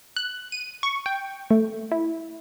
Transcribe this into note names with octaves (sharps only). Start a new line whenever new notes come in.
F#6
D#7
C#6
G5
A3
E4